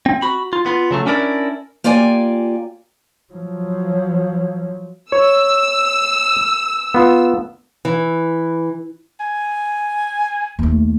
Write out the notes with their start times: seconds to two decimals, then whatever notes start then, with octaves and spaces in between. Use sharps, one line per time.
0.06 C4
0.22 F#4 B5
0.53 F4
0.66 B3 F4
0.91 C#3 F#3 A3
1.06 C#4 D4 E4 A#4 D5
1.84 A#3 F4 G4 D5 G#5
3.33 F3 F#3
5.12 C#5 E6
6.94 B3 F4
7.85 E3
9.20 G#5
10.59 D#2 A3